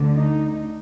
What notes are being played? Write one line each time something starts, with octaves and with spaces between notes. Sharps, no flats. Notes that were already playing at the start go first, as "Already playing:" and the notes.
Already playing: D2 D3
D#4